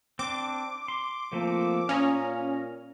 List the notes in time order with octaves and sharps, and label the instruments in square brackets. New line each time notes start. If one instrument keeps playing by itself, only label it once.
[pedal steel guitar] C4 D4 [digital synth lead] D6
[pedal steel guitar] C6
[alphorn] F3 [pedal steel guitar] A3 A#3 C4
[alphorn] A#2 [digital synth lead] C#4 [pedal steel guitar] F5 A#5 D#6